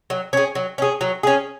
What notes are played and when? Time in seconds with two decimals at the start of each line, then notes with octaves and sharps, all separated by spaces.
0.10 F#3
0.33 C#4 G#4
0.55 F#3
0.78 C#4 G#4
1.01 F#3
1.23 C#4 G#4